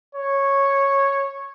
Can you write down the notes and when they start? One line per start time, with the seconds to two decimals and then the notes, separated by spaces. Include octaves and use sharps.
0.15 C#5